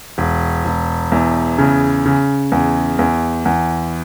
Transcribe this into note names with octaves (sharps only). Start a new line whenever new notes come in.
E1
E1
E2
C#3
C#3
E2
E2
E2